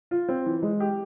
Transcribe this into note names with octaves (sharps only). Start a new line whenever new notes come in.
F4
C4
E3
G#3
G4